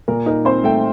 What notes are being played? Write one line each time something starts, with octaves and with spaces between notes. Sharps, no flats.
A#2 A#4
D#4 A#4
C4 C5
A3 G5